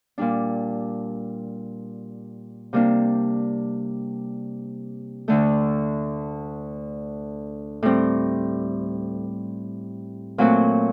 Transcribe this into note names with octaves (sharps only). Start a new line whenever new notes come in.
A#2 G3 D4
C3 G3 A#3 D4
D2 D3 A3
A2 G3 C4
A#2 F#3 A3 C4 F#4